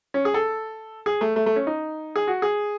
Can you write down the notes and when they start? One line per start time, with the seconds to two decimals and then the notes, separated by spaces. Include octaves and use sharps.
0.14 C#4
0.25 G#4
0.34 A4
1.06 G#4
1.21 A3
1.36 A3
1.46 A3
1.56 C#4
1.67 D#4
2.16 G#4
2.27 F#4
2.42 G#4